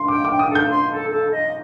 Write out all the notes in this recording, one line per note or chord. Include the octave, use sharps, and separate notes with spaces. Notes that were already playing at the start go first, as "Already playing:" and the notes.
Already playing: C6
G5 D6
D6
G5
D#6
A4
G6
C6
A4
A4
D#5